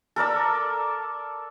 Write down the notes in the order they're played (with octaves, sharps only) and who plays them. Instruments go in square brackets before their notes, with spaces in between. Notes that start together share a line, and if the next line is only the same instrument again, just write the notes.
[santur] A4 A#4 D5 E6